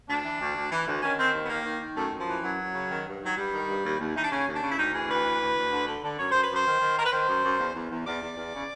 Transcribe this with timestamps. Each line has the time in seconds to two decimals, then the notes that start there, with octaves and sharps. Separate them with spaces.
0.08 D2 D4
0.24 E3
0.39 D2
0.55 D2
0.70 E3
0.87 D2
1.02 D#3 C#4
1.18 D#3 C4
1.33 D#2
1.45 B3
1.49 D#3 A#3
1.64 D#3
1.80 D#3
1.96 F#2 A3
2.11 F#2
2.19 F3
2.27 E3
2.42 F#2 F#3
2.59 F#2
2.73 C#3
2.90 D#3
3.05 G2
3.21 D#3 F#3
3.37 G2 G3
3.52 D#3
3.68 G2
3.83 D#2
3.99 D#2
4.15 E3 D#4
4.23 D4
4.30 C#3 C#4
4.46 D#2
4.54 D4
4.61 C#3
4.70 E4
4.77 D2 D#4
4.93 E3 G#4
5.08 D2 B4
5.25 E3
5.40 D2
5.55 D2
5.71 D3
5.87 D3
6.03 D3
6.18 F#2 C#5
6.31 F#2 C5
6.43 B4
6.49 F#2
6.56 C5
6.65 D#3
6.80 D#3
6.96 D#3 A#4
7.04 B4
7.11 D#3 C5
7.27 F#2
7.43 F#2
7.59 E2
7.74 E2
7.90 E2
8.06 E2 D5
8.21 E2
8.37 E2
8.53 C#3